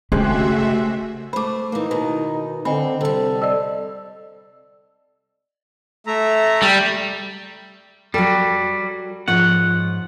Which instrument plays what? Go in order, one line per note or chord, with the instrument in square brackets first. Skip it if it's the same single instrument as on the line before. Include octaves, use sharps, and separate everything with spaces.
[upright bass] C#3 [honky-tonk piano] G#3 C4 G4 [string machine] A3 F#4 E5
[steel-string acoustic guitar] A3 C5 [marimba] B5 D6
[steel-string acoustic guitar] E3 A#3 [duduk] D#4
[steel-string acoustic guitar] B2 D#3
[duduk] D3 [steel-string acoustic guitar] C4 [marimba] D#5 G#5 B5
[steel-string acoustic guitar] C3 G3 [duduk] A4
[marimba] D5 D#5 E6
[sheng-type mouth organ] A3 E5 A#5
[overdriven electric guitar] G3
[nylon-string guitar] F#3 A4 [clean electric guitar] G3
[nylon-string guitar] G#2 F3 C#5 [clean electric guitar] F#5